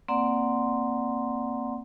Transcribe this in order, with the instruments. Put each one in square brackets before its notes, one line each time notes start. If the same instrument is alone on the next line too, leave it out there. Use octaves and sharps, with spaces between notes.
[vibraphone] A#3 C4 D5 F#5 A#5 C6